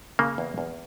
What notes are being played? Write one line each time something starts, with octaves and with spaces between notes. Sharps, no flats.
C#3 A#3
E2
E2